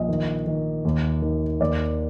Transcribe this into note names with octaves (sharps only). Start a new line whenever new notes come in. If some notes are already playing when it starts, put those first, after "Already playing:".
Already playing: A#1 D#5
D#3
D#3
D#2
D#3
D#2 D5